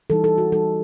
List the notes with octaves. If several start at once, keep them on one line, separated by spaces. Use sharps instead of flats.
E3 G3 D#4 A4
A4
F#4
E3 G3 D#4 A4